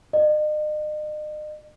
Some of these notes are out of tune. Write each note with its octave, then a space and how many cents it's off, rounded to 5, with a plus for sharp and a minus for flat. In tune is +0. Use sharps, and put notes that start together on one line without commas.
D#5 -40